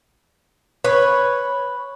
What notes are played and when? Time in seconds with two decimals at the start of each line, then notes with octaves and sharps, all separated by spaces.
0.85 B4 C#5